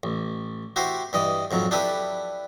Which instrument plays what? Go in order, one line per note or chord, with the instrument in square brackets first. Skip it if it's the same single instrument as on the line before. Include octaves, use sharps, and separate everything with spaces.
[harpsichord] A1
E4 F#4 G4 C5
G2 E3 D#5
F2 G#2 F#3
D4 E4 G4 A4 B4